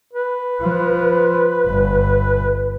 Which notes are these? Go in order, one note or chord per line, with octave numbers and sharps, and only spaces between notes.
B4
F3
G1